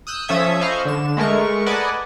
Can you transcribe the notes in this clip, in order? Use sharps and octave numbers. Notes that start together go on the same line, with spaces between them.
D#6 E6 F#6 G6
F3 C#4 A4 E5 D#6 G#6
C5 D#5 F5 B5 C#6
D3 E7
G#3 A3 A#4 C#6
B4 D5 D#5 F#5 G#5 A5